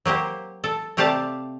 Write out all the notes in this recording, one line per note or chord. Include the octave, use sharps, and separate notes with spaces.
F#3 A#3 G4 C5
A4
C3 A3 G4 D5 F5 A5